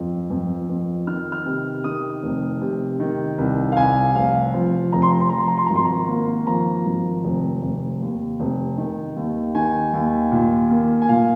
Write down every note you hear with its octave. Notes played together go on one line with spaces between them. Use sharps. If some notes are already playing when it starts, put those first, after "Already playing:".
Already playing: F2
F2
F2
D#3 F6
F6
C3
D#3 D#6
F1
C3
D#3
C2
F5
C2 G#5
F1 F5
F3
F1 A#5
C6
A#5
C6
F3 A#5
C6
A#5
C6
G#1 A#5
C6
A#5
A#3
F3 A#5
G#1
F1
F1
D#2
F1
D#3
D#2
D#3 G#5
D#2
A#2
A#3
G#5
A#2 F5